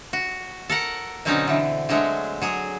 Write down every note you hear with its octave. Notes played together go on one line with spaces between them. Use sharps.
F#4
A4 A#4 F#5
B2 D3 F#3 C4 C#4 D#4
D3 E3
D3 F#3 G#3 A3
F#3 G#4